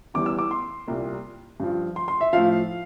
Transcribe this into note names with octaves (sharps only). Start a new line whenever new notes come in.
E2 E3 G3 D6
E6
D6
C6
C2 A#2 G3
G2 F3
C6
C6
E5
A2 F3 F5